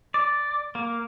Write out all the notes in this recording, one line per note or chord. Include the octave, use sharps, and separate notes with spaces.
D5
A#3